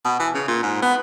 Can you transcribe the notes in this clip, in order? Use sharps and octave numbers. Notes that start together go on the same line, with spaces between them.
B2
E3
C#3
A#2
G#2
B3